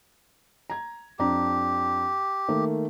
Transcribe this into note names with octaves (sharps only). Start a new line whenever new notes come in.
A#5 G#6
F2 D4 G4 A#5
D#3 A3 A#3